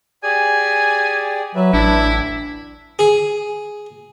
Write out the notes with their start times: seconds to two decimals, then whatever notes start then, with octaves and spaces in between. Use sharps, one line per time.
0.23 G4 G#4 D5 G#5
1.55 F#3 B4 E5
1.73 A1 D4 E4
2.99 G#4